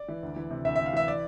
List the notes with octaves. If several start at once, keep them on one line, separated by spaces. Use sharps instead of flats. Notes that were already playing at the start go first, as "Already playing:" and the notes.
Already playing: D5
E3
D2
E3
C3
D2 E5
D2 E5
F5
E3 E5
D5